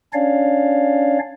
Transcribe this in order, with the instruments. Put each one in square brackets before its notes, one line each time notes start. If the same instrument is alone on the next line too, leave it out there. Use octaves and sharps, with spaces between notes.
[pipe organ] C#4 D4 C#5 D5 F5